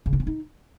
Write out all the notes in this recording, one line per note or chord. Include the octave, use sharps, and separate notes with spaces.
C#3
D4
C4
D#4